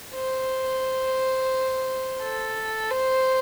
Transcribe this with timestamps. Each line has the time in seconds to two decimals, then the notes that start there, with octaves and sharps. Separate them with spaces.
0.14 C5
2.22 A4
2.90 C5